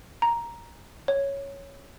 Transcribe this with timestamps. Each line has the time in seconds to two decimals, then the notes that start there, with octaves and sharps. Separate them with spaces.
0.22 A#5
1.08 C#5